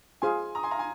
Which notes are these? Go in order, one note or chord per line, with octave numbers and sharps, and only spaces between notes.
F4 G#4 C5 F5 G#5 C6
A#5 D#6
G#5 C6
F5 A#5
G#5